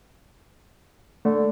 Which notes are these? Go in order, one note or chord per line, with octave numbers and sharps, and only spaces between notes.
D3 A3